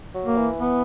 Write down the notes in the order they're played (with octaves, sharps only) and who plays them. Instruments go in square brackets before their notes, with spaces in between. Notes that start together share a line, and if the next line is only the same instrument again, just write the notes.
[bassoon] F#3
[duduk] A#3
[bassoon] E3
[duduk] B3